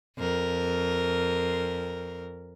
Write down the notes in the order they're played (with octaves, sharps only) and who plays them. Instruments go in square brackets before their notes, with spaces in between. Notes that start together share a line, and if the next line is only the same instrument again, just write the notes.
[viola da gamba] F2 A#4